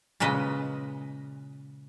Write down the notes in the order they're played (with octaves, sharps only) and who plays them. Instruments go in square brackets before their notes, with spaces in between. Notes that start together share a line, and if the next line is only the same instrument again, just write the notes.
[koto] A#2 C#3 G#3 B4 D#5